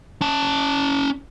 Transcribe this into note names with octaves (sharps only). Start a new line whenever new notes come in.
C#4 A5